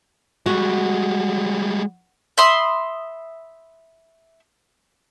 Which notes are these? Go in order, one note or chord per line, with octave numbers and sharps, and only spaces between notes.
G3 G#3 F#4
E5 B5 C6 D#6